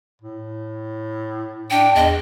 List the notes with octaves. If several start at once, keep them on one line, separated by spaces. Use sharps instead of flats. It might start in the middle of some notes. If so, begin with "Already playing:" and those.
A2
D4 G5
E2 D#5